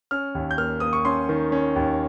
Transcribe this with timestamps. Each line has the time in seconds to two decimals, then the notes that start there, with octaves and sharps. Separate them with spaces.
0.11 C#4 F6
0.35 D#2
0.51 G6
0.58 A#3 F6
0.80 A#3 D#6
0.93 C#6
1.05 C#4 C6
1.29 D#3
1.52 C#4
1.76 D#2